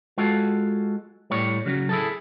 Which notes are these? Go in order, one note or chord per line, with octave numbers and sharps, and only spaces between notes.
G#3 F4 F#4 A4
A2 G3 C#5
C#3 F#3
E4 G#4 A4